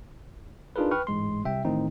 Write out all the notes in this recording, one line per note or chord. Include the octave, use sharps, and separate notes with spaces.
D4 D#4 F4 G#4 A#4 B4
B4 G5 C#6 F6
A1 G#2 G#3 C6
C2 C3 E5 G5
A1 A2 D#3 C4 D#4